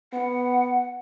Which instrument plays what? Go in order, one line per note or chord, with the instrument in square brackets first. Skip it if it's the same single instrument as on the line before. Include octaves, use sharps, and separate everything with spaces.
[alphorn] B3 [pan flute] F#5